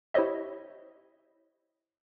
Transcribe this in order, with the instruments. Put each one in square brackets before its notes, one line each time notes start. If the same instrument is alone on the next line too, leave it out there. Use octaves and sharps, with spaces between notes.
[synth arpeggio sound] E4 G4 C5 C#5 D#5 E5